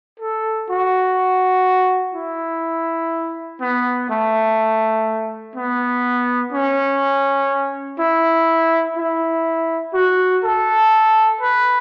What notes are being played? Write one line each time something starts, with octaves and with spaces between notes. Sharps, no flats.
A4
F#4
E4
B3
A3
B3
C#4
E4
E4
F#4
A4
B4